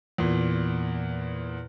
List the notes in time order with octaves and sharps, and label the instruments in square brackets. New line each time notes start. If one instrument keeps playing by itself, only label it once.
[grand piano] E2 A#2